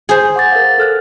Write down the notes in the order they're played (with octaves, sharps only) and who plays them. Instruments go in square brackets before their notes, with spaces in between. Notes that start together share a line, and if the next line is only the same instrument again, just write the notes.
[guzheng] G#4 C5
[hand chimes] F#5 D6 A6
A#4 F5
A4 F6 F#6